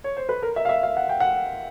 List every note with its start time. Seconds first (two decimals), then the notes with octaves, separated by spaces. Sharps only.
0.04 C#5
0.17 C5
0.29 B4
0.43 A#4
0.56 E5
0.65 F5
0.69 E5
0.83 F5
0.97 F#5
1.09 G5
1.20 F#5